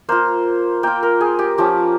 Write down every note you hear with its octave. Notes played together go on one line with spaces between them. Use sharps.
A#3 F4 C5
A#3 F4 G5
A#4
G#4
G4
F3 A#3 C#4 G4